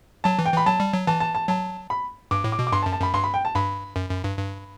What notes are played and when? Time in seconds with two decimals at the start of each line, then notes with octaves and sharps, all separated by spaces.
0.24 F#3 A5
0.39 E3
0.46 G5
0.53 E3 B5
0.66 F#3 A5
0.80 G3
0.94 F#3
1.07 E3 A5
1.20 A5
1.35 A5
1.48 F#3 A5
1.90 B5
2.31 G2 D6
2.44 A2
2.52 D6
2.59 B2
2.67 D6
2.72 G2 C6
2.82 A5
2.86 F#2
2.92 A5
3.00 F#2 B5
3.14 G2 C6
3.24 B5
3.34 G5
3.45 A5
3.55 G2 B5
3.96 F#2
4.09 F#2
4.24 G2
4.37 G2